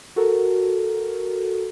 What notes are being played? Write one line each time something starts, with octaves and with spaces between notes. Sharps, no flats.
F#4 A4 A#4